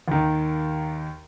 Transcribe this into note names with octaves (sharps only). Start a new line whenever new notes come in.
D#2 D#3